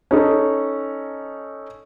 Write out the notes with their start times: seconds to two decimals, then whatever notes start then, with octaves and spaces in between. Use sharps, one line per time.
0.11 C#4 D#4 A4